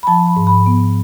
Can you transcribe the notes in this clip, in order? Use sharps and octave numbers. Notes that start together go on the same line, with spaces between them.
B5
F3 A5
B5
G#2
B5
B3